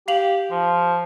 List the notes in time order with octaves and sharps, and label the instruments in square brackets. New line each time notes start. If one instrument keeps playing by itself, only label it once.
[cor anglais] G4 [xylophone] F5 F7 F#7
[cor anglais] F3